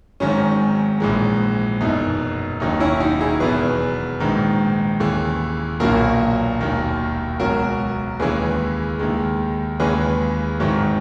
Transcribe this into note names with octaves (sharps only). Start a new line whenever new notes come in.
G#1 G#2 D#3 F#3 C#4
A#1 G#2 E3 G#3
F#1 E2 B2 D#4
E1 D#2 D#3 F#3 D#4
C#4 E4
D#4 F#4
E4 G#4
E2 B2 F#3 G#4 B4
A#1 G#2 D#3
D#2 C#3 E3
B1 A#2 F#3 F#4 A#4
E1 D#2 D#3
C#2 B2 F#3 F#4 A#4
D#2 C#3 E3 G#3 G#4 B4
D#2 D#3 G#3
D#2 C#3 E3 G#3 G#4 B4
G#1 G#2 D#3 F#3